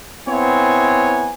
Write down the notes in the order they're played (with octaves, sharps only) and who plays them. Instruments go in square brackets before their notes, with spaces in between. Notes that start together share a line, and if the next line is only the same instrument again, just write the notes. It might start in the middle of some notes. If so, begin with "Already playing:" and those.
[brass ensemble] B3 C4 E4 C#5 G#5